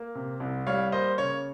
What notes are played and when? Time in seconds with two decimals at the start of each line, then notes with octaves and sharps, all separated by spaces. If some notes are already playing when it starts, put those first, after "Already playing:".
Already playing: A#3
0.15 C3
0.40 C2
0.67 G3 C#5 F5
0.92 A#3 C5 D#5
1.18 C#3 C#5